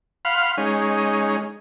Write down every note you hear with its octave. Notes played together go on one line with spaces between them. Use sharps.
F5 F#5 B5 C6 F6
G#3 C#4 D#4